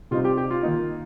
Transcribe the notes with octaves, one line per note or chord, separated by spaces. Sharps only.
C3 G3 C4 D#4 F4
G4
G4
F4
D#3 A#3 D#4